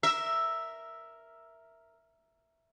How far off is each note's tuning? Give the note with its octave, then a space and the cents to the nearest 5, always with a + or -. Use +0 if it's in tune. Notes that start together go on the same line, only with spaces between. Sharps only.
A#4 +0 E5 +0